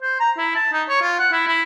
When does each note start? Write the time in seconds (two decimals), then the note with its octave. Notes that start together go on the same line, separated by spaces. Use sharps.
0.02 C5
0.20 A#5
0.38 E4
0.55 A5
0.73 D#4
0.89 C#5
1.01 F4
1.19 F#5
1.32 E4
1.47 E4